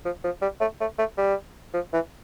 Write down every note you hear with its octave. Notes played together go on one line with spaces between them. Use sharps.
F3
F3
G3
A3
A3
A3
G3
F3
E3